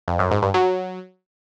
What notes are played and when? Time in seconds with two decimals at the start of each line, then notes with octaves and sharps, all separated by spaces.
0.08 F2
0.19 F#2
0.31 G#2
0.43 G2
0.54 F#3